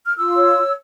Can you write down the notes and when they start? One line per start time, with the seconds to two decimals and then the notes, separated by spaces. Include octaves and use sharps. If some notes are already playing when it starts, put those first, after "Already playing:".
0.04 F6
0.16 F4 E6
0.36 C#5